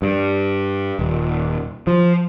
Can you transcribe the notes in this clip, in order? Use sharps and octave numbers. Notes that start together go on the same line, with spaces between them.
G2
D#1
F3